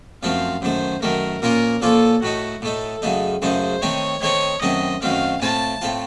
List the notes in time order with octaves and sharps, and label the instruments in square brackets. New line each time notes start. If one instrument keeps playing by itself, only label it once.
[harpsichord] F#2 F3 A3 C4 [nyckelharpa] F5
[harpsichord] F#2 D#3 A3 [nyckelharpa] C5
[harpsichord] F#2 D#3 A3 [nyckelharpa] A#4
[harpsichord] A#2 F3 A#3 C#4 F4 [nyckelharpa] A#4
[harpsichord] A#2 F3 A#3 C#4 F4 [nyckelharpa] A4
[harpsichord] A2 A3 D#4 [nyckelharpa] F#4
[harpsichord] A2 A3 D#4 [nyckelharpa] A4
[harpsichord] F#2 C#3 A3 D#4
[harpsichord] F#2 C#3 A3 D#4 [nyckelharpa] C5
[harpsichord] D#3 A3 C4 D#4 [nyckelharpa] C#5
[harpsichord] D#3 A3 C4 D#4 [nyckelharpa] C#5
[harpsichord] F#2 D#3 F#3 A3 C4 [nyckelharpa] D#5
[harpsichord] F#2 D#3 F#3 A3 C4 [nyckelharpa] F5
[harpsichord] A2 A3 C4 F4 [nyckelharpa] A5
[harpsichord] A2 A3 C4 F4